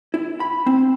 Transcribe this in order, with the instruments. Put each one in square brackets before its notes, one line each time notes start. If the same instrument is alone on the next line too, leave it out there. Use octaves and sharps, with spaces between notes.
[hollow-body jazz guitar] E4
B5
C4